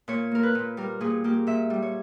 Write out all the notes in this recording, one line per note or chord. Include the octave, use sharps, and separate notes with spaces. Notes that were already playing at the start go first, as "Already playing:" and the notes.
A#2 C#5
A#3 A#4
B4
A#2
G3 A#4
A#2 G#4
A#3 G4
A#2 E5
G3
C#5